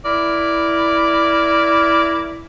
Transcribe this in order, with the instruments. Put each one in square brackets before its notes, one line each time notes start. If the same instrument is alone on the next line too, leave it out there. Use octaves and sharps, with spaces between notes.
[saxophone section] E4 A#4 D5